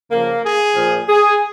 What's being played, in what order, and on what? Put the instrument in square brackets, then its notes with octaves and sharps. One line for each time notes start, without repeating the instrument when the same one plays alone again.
[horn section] C#3 F3 A#3
G#4
A#2 F3
G#4